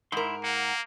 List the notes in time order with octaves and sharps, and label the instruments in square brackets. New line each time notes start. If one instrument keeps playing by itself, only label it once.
[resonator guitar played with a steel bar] G#2 A#4 [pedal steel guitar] E4 B5 C6
[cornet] A#3 [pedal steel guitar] F#5